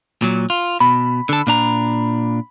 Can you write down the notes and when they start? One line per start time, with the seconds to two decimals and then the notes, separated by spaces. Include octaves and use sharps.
0.22 A#2 F#3
0.50 F4
0.80 B2 B5
1.29 D3 A4
1.47 A#2 D4 A#5